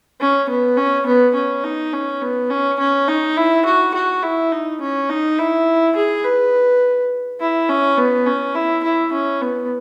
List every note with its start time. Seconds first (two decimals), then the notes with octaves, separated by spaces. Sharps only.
0.20 C#4
0.49 B3
0.77 C#4
1.06 B3
1.35 C#4
1.64 D#4
1.93 C#4
2.22 B3
2.50 C#4
2.79 C#4
3.08 D#4
3.37 E4
3.65 F#4
3.94 F#4
4.23 E4
4.52 D#4
4.81 C#4
5.10 D#4
5.39 E4
5.96 G#4
6.24 B4
7.41 E4
7.69 C#4
7.98 B3
8.26 C#4
8.55 E4
8.84 E4
9.12 C#4
9.42 B3